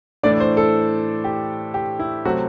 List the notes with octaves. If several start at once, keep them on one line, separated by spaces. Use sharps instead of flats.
A2 E3 A3 D4 D5
C5
A4
G4
G4
E4
C3 F#3 A3 C4 F#4